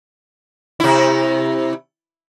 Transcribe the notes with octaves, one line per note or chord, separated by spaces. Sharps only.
C3 E4